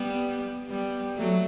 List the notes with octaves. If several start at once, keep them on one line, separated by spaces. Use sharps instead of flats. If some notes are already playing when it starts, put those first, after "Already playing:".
Already playing: G3 B3
G3 B3
F#3 A3